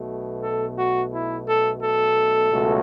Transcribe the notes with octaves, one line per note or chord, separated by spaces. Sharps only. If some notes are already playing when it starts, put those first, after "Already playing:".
Already playing: B1 B2 A3
A4
F#4
E4
A4
A4
C#2 B2 F#3 A3